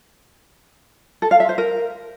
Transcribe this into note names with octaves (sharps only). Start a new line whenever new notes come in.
A4
F5
E5
C5
A#4